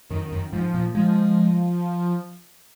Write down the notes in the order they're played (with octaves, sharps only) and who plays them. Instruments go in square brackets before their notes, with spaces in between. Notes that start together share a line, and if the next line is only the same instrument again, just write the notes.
[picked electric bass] F#2 [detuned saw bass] D#3
[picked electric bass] F#2
[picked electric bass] G#2 [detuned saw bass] F3
[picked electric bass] A#2
[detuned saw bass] F3 [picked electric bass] G#3